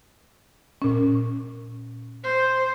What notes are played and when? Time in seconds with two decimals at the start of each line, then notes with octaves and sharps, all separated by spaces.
0.82 A#2 C#4
2.24 C5